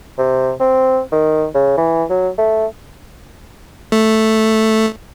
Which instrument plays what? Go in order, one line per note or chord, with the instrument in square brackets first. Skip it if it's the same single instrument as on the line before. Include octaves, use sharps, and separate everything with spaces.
[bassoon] C3
C4
D#3
C#3
E3
F#3
A3
[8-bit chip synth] A3